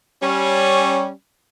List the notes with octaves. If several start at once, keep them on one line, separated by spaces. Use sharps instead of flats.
G3 C#4